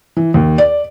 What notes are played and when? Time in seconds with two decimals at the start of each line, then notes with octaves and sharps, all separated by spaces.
0.17 E3
0.34 D#2
0.58 D5